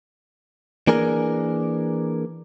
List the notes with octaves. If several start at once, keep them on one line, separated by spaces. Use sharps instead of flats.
E3 A#3 D4 G#4 A#4